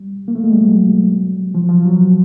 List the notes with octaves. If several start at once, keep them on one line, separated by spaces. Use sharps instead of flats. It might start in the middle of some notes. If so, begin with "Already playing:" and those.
Already playing: G3
A#3
A3
G#3
G3
F#3
F3
F3
F#3